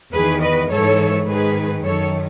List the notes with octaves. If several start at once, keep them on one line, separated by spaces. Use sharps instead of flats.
E2 D#3 G#4 B4
B4 D#5
G#2 E3 A4 C#5
G#2 D#3 G#4 B4
F#2 D#3 A4 C#5